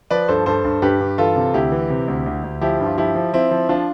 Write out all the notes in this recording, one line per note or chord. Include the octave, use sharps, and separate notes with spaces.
F3 B4 D5
G2 A4 C5
G2 A4 C5
G2
G2 G4 B4
G2
E3 F4 A4
C3
D2 E4 G4
E3
C3
D2
D2
D2
F3 E4 G4
G2
F4
F3 E4 G4
F3
F3 C4 E4
F3
F3 D4 F4